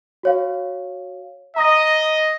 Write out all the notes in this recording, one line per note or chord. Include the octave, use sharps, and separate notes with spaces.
F#4 C#5 F5
D#5 A#5 D#6 A#6